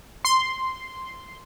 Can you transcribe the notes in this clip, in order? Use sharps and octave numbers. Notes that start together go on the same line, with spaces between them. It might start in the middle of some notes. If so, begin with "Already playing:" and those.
C6